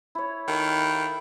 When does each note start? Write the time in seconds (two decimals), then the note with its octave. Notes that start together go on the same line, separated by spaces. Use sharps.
0.15 E4 C#5
0.48 D#3 A4